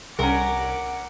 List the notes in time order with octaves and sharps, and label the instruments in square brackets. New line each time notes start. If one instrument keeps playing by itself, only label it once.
[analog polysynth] C2 [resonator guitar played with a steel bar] C#4 A#4 [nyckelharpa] F#5 D6